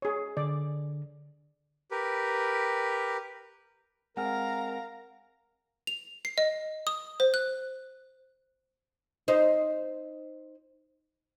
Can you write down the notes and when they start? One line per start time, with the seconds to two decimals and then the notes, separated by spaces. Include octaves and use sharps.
0.02 G#4 C#5
0.37 D3 D5
1.91 G4 A#4 B4
4.17 G#3 C4 A#4 F5 F#5 G#5 A#5 F6
5.87 F7
6.25 C7
6.38 D#5
6.87 D#6
7.20 C5
7.34 F#6
9.28 D#4 C5